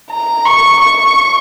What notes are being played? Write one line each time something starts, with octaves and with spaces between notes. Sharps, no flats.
A#5
C#6
C#6